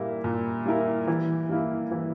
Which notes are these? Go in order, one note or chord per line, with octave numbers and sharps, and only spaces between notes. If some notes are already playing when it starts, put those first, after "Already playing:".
Already playing: A#2 G3 A#3 E4 A#4
A#2
G3 A#3 E4 A#4
E3
G3 A#3 E4
E3